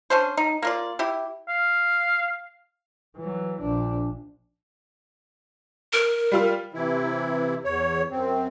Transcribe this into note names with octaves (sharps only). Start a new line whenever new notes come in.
C#4 D4 C5
D#4
A#3 F4 D5
E4 G4
F5
E3 F#3
A#1 D4
A#4
G3 F4 F6
C3 E3 E4
E2 C#5
F#2 C4